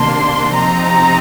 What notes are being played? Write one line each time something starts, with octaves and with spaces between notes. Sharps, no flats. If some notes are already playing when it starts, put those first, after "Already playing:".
Already playing: C3 D#3 A#3 D4 C6
C3 F3 C4 D#4 A#5